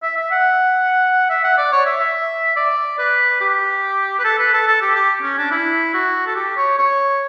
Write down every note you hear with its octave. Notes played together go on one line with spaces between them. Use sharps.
E5
E5
F#5
E5
F#5
D5
C#5
E5
E5
D5
B4
G4
B4
A4
B4
A4
A4
G4
G4
C#4
D4
E4
F#4
A4
G4
C#5
C#5